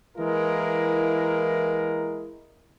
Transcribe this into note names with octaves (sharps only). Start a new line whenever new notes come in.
E3 G#3 A#3 E4 A#4